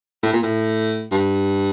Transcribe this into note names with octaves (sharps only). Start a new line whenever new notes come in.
A2
A#2
A2
G2